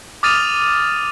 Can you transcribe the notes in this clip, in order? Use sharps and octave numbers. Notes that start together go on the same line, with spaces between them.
D6 D#6 F6 A6 D#7 F7